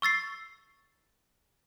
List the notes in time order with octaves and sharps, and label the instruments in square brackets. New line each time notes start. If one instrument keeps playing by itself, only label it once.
[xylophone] C#6 E6 A6 C7